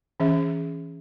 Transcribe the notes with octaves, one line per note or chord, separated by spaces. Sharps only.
E3 C#4 G#4 E5